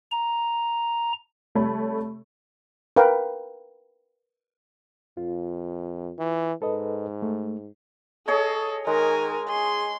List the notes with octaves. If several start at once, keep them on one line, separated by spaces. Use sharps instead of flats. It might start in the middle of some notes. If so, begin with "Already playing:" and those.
A#5
C3 G3 A3 A4 C#5 B5
A#4 B4 F5 G5
F2 F4
E3
G#2 A4 B4 D#5
A3
G#4 A4 C#5 D#5
D#3 G#3 A#4 G#5
G#4 C6